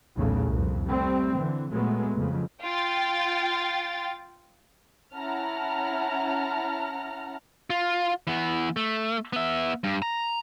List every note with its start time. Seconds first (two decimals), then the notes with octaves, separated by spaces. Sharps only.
0.16 B1 E2 A#2 C#3 E3 A3
0.48 C2 F2
0.85 G3 A3 C4
1.36 D3 E3
1.71 A#2 F#3 G#3 A3 B3
2.16 F2 C#3
2.62 F4 G5 A6
5.15 C#4 E4 F#5 A5 A#5 F6
7.70 F4
8.27 E3 B3
8.77 A3
9.33 B3 E5
9.84 G2
10.02 A#5